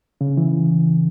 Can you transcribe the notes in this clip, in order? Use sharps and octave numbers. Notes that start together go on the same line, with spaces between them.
C#3
E3